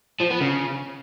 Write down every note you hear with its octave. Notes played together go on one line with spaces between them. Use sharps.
F3
B3
C#3